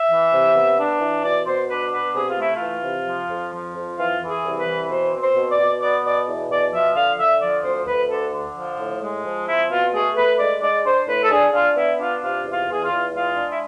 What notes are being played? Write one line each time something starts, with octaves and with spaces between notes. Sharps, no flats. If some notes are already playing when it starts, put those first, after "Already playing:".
Already playing: E5
E3
C3
B3
D4
E3
B2 D5
B2 C5
D4 B4
B3 B4
C3 G#4
F4
A3 E4
F4
E3
C3
F3
F2
F3
F2
E3 F4
E3
G#4
C2
B4
E3
B2 C5
C4
C5
B2
D5
B2
B3 D5
B2 D5
E2
B2 D5
F3 E5
D3 F5
D3 E5
F3 D5
D2 C5
D2 B4
D3 A4
D3
F3
A2
G#3
F3
C4 E4
B2 F4
A3 G#4
A3 B4
G#3 D5
G#3 D5
D4 C5
A2 B4
A4
D4 G#4
D4 F4
B3 E4
D4 F4
C3 F4
E2
F4
E2 G#4
F4
E2
G#3 F4
D4
E4